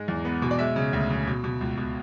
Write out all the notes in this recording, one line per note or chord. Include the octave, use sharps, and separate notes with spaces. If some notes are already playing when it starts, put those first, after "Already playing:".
Already playing: G#2 G#3
E2
B3
B2
D5
G#3 E5
C#3
D2
C#3
B2
B2
C#2
B2